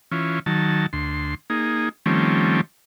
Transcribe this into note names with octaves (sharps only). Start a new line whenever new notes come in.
E3 C#4 F4
D#3 F#3 A5
D2 C6
A#3 D#4 G#4
D#3 F3 G3 A3 C4 C#4